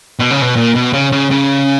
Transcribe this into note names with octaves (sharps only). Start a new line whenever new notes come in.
B2
C#3
B2
A#2
B2
C#3
C#3
C#3